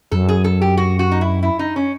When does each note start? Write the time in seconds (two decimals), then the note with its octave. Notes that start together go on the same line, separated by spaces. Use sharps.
0.11 F#2 A4
0.29 G#4
0.44 A4
0.62 G4
0.77 F#4
0.99 F#4
1.11 D#4
1.21 E4
1.43 E4
1.59 D#4
1.76 C#4